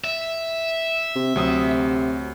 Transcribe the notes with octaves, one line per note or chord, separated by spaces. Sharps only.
E5
C3
D2 C3 F#3 D#6